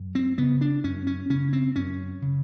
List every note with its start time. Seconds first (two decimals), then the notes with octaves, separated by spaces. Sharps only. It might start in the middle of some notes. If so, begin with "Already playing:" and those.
Already playing: F#2
0.15 C4
0.38 C#3 B3
0.61 D4
0.84 F#2 C#4
1.07 C#4
1.30 C#3 C#4
1.53 C4
1.76 F#2 C#4
2.22 C#3